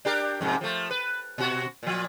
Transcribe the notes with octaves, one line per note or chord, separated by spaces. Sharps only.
D4 G4 A#4
F2 G#2 C3
F3 A3
B4
B2 F#4
A#2 F3